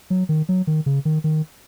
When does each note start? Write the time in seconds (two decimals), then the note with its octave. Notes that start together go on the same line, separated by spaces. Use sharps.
0.10 F#3
0.29 D#3
0.49 F#3
0.67 D#3
0.86 C#3
1.05 D#3
1.24 D#3